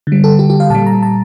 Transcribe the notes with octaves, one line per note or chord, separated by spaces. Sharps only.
D3 G3
A4
G4
G4
F5
A#2 G3 A5
A#5
A5